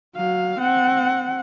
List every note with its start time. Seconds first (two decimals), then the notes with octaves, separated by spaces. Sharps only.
0.15 F#3 F5
0.59 C4 F#5